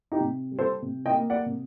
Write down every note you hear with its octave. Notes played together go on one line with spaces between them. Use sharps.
D#4 G4
C3
G3
A4 C5
C3
D#5 G5
A#3
D5 F#5
C3